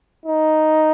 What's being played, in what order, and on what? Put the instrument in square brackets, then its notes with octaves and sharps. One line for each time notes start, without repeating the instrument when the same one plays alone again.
[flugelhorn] D#4